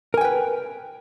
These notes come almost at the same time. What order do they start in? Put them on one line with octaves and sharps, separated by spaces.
A#4 G#5 G5 B4